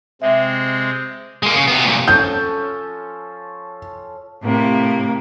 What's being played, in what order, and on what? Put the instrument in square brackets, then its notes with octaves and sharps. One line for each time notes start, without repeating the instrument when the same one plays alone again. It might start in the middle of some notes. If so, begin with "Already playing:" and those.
[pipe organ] C3 G#3 C4 [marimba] E5
[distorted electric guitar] G#3 A#3
C#3
C3 B3
C2 A#2
[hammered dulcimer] F3 C#4 A4 [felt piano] G6
[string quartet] A2 C3 A#3